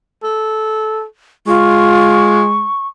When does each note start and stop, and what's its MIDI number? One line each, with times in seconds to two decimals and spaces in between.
0.23 1.04 69
1.47 2.67 56
1.47 2.39 65
1.47 2.87 85